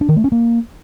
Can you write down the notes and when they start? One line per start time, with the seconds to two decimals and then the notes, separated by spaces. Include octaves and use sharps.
0.01 D4
0.09 D#3
0.16 A3
0.24 C#4
0.32 A#3